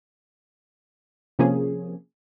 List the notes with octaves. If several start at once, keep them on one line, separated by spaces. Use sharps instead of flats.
C3 F3 A#3 C#4 G#4